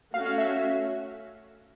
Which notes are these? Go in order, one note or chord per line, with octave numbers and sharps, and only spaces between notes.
A3 C#4 F#4 F5
F5
E5